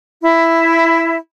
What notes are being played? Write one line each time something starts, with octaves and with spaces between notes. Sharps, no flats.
E4